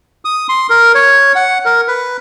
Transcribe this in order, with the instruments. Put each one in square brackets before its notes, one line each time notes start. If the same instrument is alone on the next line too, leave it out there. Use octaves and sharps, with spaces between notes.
[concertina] D#6
C6
A#4
C#5
F#5
A#4
B4